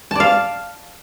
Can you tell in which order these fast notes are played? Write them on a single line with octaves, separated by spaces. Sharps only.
A5 D5 F5